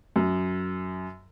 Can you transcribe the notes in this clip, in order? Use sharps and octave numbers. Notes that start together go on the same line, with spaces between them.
F#2